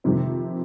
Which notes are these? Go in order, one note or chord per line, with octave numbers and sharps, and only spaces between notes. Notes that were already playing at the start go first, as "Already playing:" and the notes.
F2 C3 D#3 C4